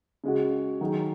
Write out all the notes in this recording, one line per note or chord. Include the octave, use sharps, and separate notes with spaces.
C#3 G#3 F#4
D#3 F#3 D#4 G#4